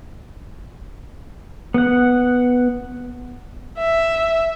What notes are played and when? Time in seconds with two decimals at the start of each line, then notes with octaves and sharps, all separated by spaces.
1.74 B3 F#5
3.78 E5